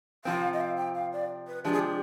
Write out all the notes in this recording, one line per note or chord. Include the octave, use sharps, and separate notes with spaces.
C3 F3 C4 F5
D#5
F5
G5
F5
D5
B4
C3 F3 G#3 D4 G4
G#4
G4